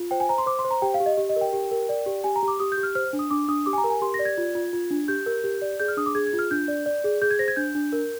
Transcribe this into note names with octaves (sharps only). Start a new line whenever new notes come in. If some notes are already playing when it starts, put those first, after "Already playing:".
Already playing: F4
C5 G5
G#5
C5 A#5
C6
C5 D6
C6
C5
A#5
G4 G5
F5
G4
D#5
G4
D#5
A#4
G5
G4
A#4
D5
G4
G4 G#5
A#5
G4
D6
G4 D#6
G6
G4
F6
C5 F6
D4
D#6
D4 D6
D4 D#6
G4 D6
G#5
A#5
A#4
G#5
G4 C6
A#6
D5
G#6
F4
F4
F4
D4
G4 G6
A#4
G4
D5
G#4 G6
F6
D4 D#6
D6
G#4 G#6
G#6
F4
F6
D4 G6
D5
D5
G#4
G#4 G6
G#6
C5 A#6
G#6
D4 G6
D4
A#4